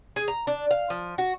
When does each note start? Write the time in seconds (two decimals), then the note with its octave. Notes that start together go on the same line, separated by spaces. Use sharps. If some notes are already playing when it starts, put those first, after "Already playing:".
0.16 G#4
0.28 A#5
0.47 D4
0.71 F5
0.90 F3
1.18 F#4